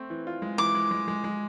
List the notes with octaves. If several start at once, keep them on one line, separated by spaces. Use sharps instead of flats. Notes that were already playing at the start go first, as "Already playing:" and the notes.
Already playing: A3 C4
E3
F4
G#3
E3 D6
G#3
G#3
G#3
G#3